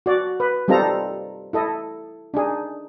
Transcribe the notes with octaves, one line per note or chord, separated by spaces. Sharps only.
F#4 D5
B4
G3 C4 D#4 F4 A4 A#5
E4 A4 D#5
D4 D#4 G#4